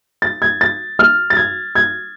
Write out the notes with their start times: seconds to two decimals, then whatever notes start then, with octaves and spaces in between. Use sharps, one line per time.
0.22 A6
0.42 G#6
0.61 A6
0.99 F6
1.30 A6
1.37 G#6
1.75 G#6